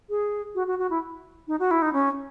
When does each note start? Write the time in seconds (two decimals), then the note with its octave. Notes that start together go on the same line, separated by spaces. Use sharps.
0.10 G#4
0.55 F#4
0.67 F#4
0.79 F#4
0.90 E4
1.48 D#4
1.59 F#4
1.71 E4
1.82 D#4
1.93 C#4